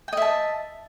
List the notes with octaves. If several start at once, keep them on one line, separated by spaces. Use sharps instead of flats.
D#5 E5 G5 A5